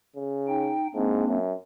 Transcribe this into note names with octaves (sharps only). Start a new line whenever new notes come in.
C#3
D#4 G5
G#2 A#3 C4 D4
F#2